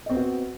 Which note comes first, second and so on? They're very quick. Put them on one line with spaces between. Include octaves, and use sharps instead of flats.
D#5 C4 B3 F#4